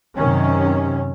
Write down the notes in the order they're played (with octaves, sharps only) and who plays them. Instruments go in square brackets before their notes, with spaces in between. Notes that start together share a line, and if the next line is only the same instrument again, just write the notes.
[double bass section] F#2 C3 D#3 C#4